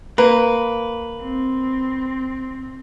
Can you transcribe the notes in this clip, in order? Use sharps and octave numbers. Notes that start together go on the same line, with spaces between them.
A#3 B4
C4